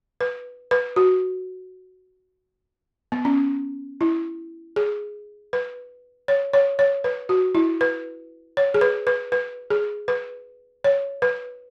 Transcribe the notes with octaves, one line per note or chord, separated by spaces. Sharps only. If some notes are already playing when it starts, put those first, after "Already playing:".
B4
B4
F#4
B3
C#4
E4
G#4
B4
C#5
C#5
C#5
B4
F#4
E4
B4
C#5
G#4
B4
B4
B4
G#4
B4
C#5
B4